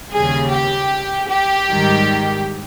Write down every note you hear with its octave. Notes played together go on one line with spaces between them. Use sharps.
D#2 C#3 G3 G#4
G4
G4
G#2 D#3 G3